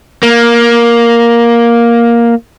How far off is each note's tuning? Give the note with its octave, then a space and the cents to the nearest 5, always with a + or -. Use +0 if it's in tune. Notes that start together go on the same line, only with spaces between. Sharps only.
A#3 +10